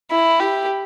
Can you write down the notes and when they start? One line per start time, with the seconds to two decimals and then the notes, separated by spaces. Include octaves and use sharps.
0.11 E4
0.40 G4